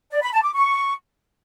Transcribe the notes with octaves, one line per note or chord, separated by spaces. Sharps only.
D5
B5
A5
D6
C#6